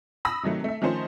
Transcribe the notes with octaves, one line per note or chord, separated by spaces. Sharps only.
B5 D#6 E6 A#6
C3 D#3 F#3 A3
A3 E5
D#3 F3 A3 C#4 D#4 C5